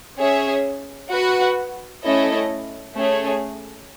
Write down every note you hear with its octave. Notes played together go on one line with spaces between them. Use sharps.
C#4 G#4 C#5 E5
F#4 B4 F#5
A3 C#4 E4 A4 D#5
A3 C#4 G#4 C#5